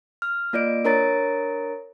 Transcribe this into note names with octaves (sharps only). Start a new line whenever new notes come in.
F6
A#3 F4 D5 D#5 D7
D4 A#4 C#5 A#5 A6 D7